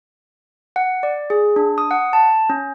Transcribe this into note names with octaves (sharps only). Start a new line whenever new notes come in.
F#5
D5
G#4
D4
D#6
F#5
A5
C#4